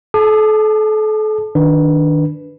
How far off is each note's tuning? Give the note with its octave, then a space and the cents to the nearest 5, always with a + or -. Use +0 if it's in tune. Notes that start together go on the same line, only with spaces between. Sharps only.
A4 -35 A5 +0 D6 +45
D#3 +0 D4 +0 B4 +0